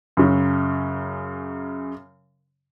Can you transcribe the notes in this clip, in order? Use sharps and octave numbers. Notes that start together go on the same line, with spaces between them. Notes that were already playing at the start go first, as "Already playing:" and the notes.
F#2 C#3